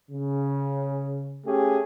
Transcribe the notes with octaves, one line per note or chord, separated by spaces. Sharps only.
C#3
A3 C#4 G4 G#4